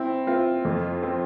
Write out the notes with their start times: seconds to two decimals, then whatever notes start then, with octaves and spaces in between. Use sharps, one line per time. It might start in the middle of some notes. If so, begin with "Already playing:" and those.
Already playing: C4 E4
0.27 C4 F4
0.65 F2
1.03 C4